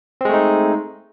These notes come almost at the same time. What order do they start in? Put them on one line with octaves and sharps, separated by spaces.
C4 G#3 A3 D#4